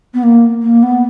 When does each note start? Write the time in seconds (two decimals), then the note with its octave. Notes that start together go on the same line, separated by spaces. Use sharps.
0.14 B3
0.23 A#3
0.62 A#3
0.83 B3